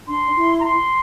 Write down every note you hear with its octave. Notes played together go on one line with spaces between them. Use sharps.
D4 C6
E4
A#5
C6